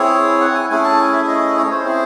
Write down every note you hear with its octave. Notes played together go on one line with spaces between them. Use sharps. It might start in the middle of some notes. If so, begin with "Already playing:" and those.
Already playing: C4 E4 G#4 C#5
F#5
G#5
A3 C#4 E4 G#4 G#5
A5
G#5
E5
D#5
C#5
C5
C4 E4 G#4